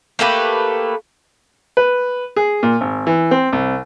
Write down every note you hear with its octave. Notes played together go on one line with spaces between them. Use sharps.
A3 A#3 G4 B4
B4
G#4
A#2
G#1
E3
C4
C2